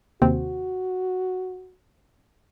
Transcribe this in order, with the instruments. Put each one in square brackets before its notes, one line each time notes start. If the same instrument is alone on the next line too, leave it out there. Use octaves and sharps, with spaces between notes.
[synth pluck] D#2 C3 C4 [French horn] F#4